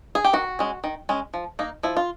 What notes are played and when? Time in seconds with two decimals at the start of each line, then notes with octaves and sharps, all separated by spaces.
0.15 G#4
0.24 G4
0.33 D#3 F#4
0.59 G#3 C#4
0.84 D#3
1.09 G#3 C#4
1.34 F3
1.59 A#3 D#4
1.83 F3 E4
1.97 F4